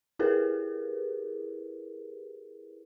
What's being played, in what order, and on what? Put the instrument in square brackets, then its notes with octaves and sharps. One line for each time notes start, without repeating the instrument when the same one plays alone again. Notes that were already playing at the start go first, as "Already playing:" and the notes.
[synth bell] E4 G4 G#4 A#4 B4